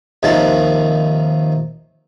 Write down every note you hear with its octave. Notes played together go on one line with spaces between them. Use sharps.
D#2 C3 D#3 F3 A5